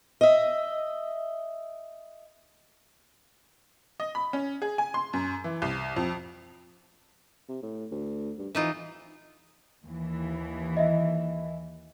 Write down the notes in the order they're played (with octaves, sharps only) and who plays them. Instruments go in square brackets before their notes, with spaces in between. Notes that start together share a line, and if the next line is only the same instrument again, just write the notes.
[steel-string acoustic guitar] D#5 E5
[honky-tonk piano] D#5
B5
C#4
G#4
G#5
C6
F#2
E3
C2
F2
[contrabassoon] C3
A2
D2
G2
[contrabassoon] F2 [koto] E3 D#4 F4
[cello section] D#2 E3
[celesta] D#5 E5